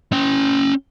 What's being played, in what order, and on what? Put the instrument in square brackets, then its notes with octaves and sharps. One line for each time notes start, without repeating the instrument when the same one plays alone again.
[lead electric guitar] C#4 G5